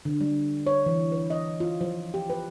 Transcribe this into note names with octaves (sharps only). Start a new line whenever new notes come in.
D3
G3
C#5
E3
B4
D#5
F4
F3
G4
B4